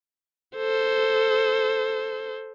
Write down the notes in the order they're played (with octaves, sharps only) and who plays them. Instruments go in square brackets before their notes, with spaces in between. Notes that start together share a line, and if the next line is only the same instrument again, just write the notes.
[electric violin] A4 C5